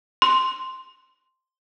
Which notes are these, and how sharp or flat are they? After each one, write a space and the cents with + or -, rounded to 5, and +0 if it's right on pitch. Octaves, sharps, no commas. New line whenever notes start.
C6 +0